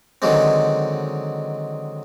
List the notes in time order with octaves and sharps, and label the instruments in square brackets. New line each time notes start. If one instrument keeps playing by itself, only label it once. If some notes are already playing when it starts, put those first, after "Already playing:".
[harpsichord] D3 D#3 F#3 G#3 C4